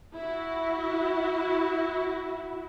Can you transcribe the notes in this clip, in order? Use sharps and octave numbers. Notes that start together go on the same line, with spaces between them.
E4 F#4